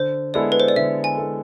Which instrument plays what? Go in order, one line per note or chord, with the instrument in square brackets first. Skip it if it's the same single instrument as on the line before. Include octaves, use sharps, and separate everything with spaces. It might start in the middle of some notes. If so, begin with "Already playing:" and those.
Already playing: [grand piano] D3 [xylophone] C5
[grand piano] G#3 B3 E4 A4 [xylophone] D5
[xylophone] B4
C5
D5
[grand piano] D3 [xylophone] E5
[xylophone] G#5
[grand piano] G#3 B3 E4 A4